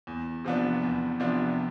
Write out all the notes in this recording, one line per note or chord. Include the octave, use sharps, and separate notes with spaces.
E2
C3 F3 B3 D4
E2
C3 F3 B3 D4